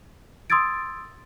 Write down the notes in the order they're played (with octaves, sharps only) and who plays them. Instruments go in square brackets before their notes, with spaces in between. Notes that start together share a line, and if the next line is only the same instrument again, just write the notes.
[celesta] C6 D#6 E6 G#6 A6 D7